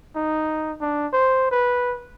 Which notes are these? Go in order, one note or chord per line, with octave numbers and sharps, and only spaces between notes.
D#4
D4
C5
B4